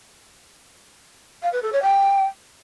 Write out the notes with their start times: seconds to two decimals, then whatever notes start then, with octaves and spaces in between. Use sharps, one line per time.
1.42 F5
1.52 B4
1.62 A4
1.72 C#5
1.82 G5